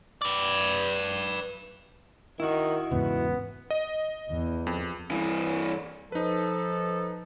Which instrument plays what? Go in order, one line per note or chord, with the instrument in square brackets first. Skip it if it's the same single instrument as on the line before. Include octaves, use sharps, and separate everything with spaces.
[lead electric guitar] B4 D5
[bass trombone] D#3 [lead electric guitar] E4 F#4
[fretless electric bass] E2 G#2 C#3 [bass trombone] B3
[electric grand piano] D#5
[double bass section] E2
[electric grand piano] F2
[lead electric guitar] G2 E3
[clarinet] F3 [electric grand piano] D#4 B4 [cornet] A4